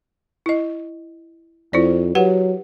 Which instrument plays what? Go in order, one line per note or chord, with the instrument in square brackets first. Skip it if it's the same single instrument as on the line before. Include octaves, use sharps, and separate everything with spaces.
[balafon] E4 D#5
[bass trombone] F2 [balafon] E4 C5 D5
[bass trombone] F#3 [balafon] G4 B4 F#5